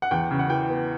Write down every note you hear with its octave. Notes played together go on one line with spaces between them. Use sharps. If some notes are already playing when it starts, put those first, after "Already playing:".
F#5
E2 G5
C#3
F#5
E3 G5
B3